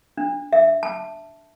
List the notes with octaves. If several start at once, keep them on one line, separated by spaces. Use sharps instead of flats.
D4
E5
A5